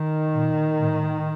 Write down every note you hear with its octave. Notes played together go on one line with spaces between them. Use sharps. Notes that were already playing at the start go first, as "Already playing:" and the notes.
Already playing: D#3
A#2
A2